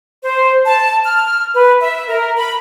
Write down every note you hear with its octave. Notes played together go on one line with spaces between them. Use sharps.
C5
A5
F6
B4
E5
A#4
B5